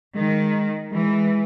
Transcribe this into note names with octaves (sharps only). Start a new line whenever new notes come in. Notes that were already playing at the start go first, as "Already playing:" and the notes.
D#3 G#3
E3 G#3